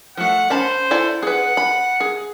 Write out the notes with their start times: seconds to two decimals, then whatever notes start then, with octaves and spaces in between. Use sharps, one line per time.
0.17 F3 A3 F#5
0.50 C#4 C5 A5 B5
0.91 E4 A4 D5
1.22 G#4 B4 F#5
1.57 B5
2.00 G#4